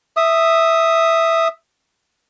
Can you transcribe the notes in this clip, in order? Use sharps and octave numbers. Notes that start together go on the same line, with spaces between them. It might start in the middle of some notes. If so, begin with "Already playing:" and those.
E5 D#6